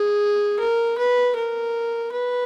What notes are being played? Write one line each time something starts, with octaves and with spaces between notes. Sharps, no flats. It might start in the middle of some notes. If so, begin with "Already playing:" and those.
Already playing: G#4
A#4
B4
A#4
B4